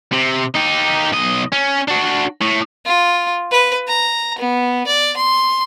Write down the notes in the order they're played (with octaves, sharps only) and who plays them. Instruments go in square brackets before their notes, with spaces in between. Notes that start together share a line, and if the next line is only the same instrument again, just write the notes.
[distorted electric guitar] C3
D#4 G4
B1 D#5
C#4
D4 F#4
A2
[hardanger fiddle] F4
B4
A#5
B3
D5
C6